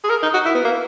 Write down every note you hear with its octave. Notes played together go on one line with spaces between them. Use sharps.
G#4
A#4
D#4
F#4
E4
B3
A#3